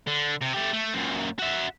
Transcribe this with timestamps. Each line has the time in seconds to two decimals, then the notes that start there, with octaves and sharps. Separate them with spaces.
0.07 D3
0.42 C3
0.54 A3 G4
0.73 A3
0.94 F#2 A#2
1.39 F#4 E5